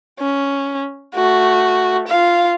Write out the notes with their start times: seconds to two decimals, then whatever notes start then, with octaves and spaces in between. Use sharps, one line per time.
0.20 C#4
1.15 A3 F#4
2.08 F4 F5